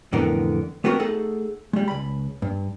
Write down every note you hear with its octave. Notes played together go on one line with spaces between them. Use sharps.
F2 A2 D3 E3 B3 A#4
A3 B3 C4 F#4 A#4
A3 D#4 G#4 A4 F#5
G3 G#3
C#2 B5
G2